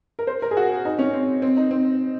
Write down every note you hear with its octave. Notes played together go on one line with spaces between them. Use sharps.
A#4
C5
A#4
G#4
F#4
D#4
C#4
C4
C4
D#4
C4